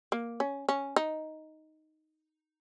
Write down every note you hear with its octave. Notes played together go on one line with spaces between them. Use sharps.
A#3
C#4
C#4
D#4